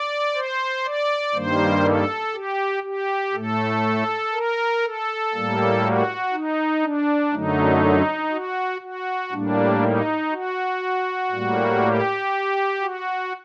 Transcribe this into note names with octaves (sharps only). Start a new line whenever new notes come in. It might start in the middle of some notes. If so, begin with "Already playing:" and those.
Already playing: D5
C5
D5
G2 D#3 G3 A#3 C5
A4
G4
G4
A2 A3 A4
A#4
A4
A2 G3 A#3
F#4
D#4
D4
F#2 D3 F#3 A3 D#4
F#4
F#4
A2 G3 A#3 D4
D#4
F#4
A2 G3 A#3
G4
F#4